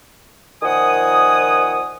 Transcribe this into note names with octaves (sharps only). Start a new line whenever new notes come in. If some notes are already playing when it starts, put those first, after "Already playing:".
A#2 D#3 F3 F#5 G#5 D#6